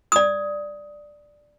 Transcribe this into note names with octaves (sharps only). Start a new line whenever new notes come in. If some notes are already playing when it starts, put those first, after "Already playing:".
D5 D#6